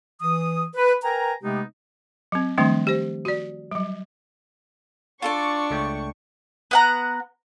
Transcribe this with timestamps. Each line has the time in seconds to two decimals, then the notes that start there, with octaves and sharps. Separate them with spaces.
0.21 E3 D#6
0.75 B4
1.03 A#4 B4 G5 G#5 A#5
1.42 C3 G#3 A3 B3 D#4 G4
2.32 F#3 C4
2.58 D#3 F3 G3 A3 C4 D4
2.87 G4 C5
3.25 F#4 D5
3.71 F#3 G3
5.22 D4 F4 A4 D5 C#6
5.70 C#2 A3 G5
6.71 B3 F#5 A#5